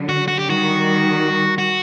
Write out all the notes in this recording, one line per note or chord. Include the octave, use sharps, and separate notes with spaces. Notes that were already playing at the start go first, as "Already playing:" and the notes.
Already playing: D3 F#3
F#4
F#4
G4
D#3 G3 F#4
F#4